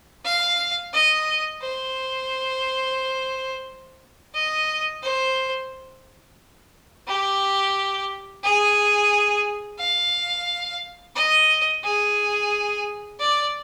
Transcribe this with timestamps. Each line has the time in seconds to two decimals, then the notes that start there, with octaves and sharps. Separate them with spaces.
0.25 F5
0.93 D#5
1.62 C5
4.34 D#5
5.02 C5
7.07 G4
8.43 G#4
9.79 F5
11.16 D#5
11.84 G#4
13.20 D5